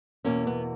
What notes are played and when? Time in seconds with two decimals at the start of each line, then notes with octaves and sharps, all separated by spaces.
0.25 E2 B2 A#3 C#4
0.47 B3